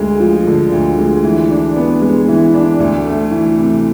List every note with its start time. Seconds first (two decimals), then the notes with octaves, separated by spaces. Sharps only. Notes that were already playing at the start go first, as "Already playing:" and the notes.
Already playing: D2 G#3
0.20 F3
0.47 D3
0.72 D2
0.99 G#3
1.24 E3
1.51 D4
1.76 B3
2.02 G#3
2.29 E3
2.55 D4
2.80 D2
3.06 A3
3.31 E3
3.58 C3